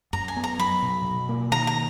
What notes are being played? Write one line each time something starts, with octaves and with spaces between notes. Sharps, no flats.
F#2 A#5
G#5
B3
A#5
F#3 B5
B2
B2
A#3
D#3 A#5
A#5